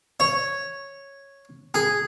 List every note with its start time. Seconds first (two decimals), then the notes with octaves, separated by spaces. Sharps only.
0.20 C#5
1.74 G#4